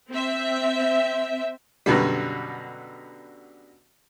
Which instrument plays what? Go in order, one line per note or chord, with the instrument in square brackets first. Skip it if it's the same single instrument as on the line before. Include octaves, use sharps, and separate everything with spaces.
[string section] C4 E5
[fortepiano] F#2 B2 D3 G3